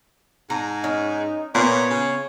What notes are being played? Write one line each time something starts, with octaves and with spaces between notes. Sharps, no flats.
G#2 A#5
C#4 D#4
A#2 B3 C#5
C#3